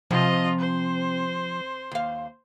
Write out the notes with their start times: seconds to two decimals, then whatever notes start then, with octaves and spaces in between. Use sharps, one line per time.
0.11 C3 F3 F4 D#5
0.60 C5
1.92 D#2 F5